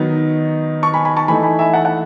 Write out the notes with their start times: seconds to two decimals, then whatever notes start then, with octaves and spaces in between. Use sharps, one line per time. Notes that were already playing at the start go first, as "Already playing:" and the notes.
Already playing: D#3 F#3 B3 D#4
0.83 A5 C#6
0.94 G#5 B5
1.05 G#5 B5
1.17 A5 C#6
1.28 E3 A3 D#4 G#5 B5
1.43 G#5 B5
1.59 E5 G#5
1.74 F#5 A5
1.85 F#5 A5